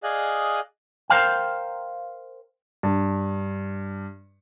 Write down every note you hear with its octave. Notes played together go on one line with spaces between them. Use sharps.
G#4 D5 D#5 F5 G#5 F#6
A#4 C5 F5 G5
G2